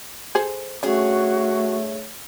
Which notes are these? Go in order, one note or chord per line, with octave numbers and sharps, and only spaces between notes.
G#4 A4 C5
G2 A3 C#4 F#4 G#4 C#5